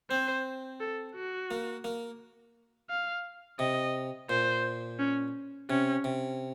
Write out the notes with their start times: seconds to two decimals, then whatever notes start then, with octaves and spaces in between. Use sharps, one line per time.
0.10 C4 C5
0.80 A4
1.15 F#4
1.51 A#3
1.84 A#3
2.90 F5
3.59 C3 D#5
4.29 A#2 C5
4.99 C#4
5.69 C3 C#4
6.04 C3